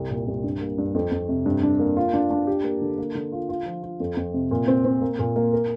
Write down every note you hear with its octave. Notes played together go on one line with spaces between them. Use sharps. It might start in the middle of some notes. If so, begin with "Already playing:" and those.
Already playing: C2
A#2
C2
G2
A#3
G2
F2
F2
C3
G2
D4
A#3
F4
D4
D4
G4
A#3
D3
A#3
D3
F4
F4
F3
F4
F2
F2
C3
A#2
C4
C4
A#3
A#2
A#3
A#4